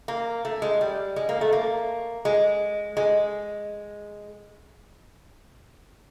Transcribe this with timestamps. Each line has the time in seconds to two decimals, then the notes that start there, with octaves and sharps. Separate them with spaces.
0.08 A#3
0.45 A3
0.62 G#3
0.81 G3
1.16 G#3
1.29 A#3
1.41 A3
1.53 A#3
2.25 G#3
2.97 G#3